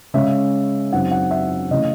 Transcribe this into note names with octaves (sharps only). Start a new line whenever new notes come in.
C#3 G#3 C#4 E5
F#2 C#3 F#3 C4 D#4 F#5
F#5
E5
C#3 E3 A3 D#5